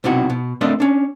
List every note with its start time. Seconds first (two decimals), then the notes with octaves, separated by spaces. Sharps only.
0.04 B1 C3 D#4 E4 F#4
0.30 B2
0.61 A3 A#3 C4 D4 D#5 C6
0.80 C#4 D4